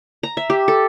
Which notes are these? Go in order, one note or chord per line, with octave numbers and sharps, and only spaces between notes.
A#5
E5
G4
A4